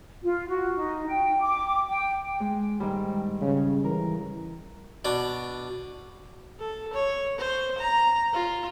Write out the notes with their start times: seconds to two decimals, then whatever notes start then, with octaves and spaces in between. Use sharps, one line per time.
0.22 F4
0.48 F#4
0.76 D#4
1.08 G5
1.40 D6
1.88 G5
2.40 G#3
2.80 G#2 D#3 G3
3.41 C#3
3.84 E3 A#4
5.05 B2 D4
6.59 A4
6.93 C#5
7.38 C5
7.78 A#5
8.33 F4